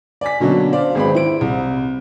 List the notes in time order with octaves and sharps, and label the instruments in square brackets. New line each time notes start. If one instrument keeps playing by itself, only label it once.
[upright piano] D5 G#5 B6
B2 D3 F#3 A#3 C#4 D4
C5 D5 F5
G#1 G#3 C4 B4 B5
E4 C5 D7
C2